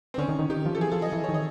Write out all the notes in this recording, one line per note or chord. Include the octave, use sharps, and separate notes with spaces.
C4
D3 C#4
D#3
D#3
D#3 G4
F3
A4
E3 G#4
F3 A4
D#5
E3
D#3 C#5
D#5